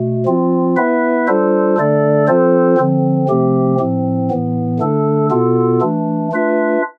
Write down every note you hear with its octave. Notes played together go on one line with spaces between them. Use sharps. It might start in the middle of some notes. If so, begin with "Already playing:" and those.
Already playing: B2 A3
F3 C4 F4
B3 E4 B4 E5
G3 D4 F4 A4 C5
D3 A3 D4 A4 D5
F3 C4 F4 A4 C5
D3 F3 C4
C3 F3 A3 C4 G4
A2 F3 C4
A2 E3 B3
D3 A3 D4 A4
B2 B3 F4 A4
E3 A3 D4
A3 D4 F4 B4 E5